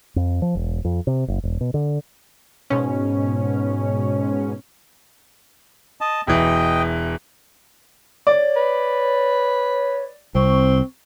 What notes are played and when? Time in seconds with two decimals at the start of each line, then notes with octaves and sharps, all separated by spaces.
0.16 F2
0.42 F3
0.55 E1
0.85 F2
1.07 C3
1.28 F#1
1.43 E1
1.61 B2
1.74 D3
2.70 G#2 B2 C#4
6.01 D#5 A5
6.27 E1 E3 D#5 G5
8.27 C#5 D5
8.56 B4
10.35 C2 C4 C#6